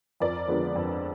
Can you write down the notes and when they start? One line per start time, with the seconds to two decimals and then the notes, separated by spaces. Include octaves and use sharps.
0.20 F2 A#4 D5
0.48 D3 F3 G#3 B3
0.76 F2